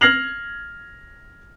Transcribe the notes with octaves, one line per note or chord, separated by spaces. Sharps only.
F6 G#6 A#6 C7 F7 F#7